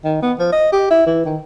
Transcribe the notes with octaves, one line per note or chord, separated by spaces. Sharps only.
D#3
B3
F3
D#5
G4
E4
E3
D#3